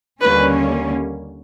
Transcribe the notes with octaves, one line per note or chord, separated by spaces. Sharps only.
D#2 D3 G3 A#3 C#4 B4